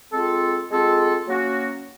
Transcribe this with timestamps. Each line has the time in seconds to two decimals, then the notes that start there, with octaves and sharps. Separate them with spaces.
0.13 G#3 C4 F4 A4
0.70 G#3 C4 F4 A4
1.26 F#3 A#3 C#4 F#4